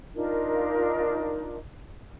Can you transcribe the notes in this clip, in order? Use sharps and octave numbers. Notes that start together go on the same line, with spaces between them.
D4 D#4 F4 A#4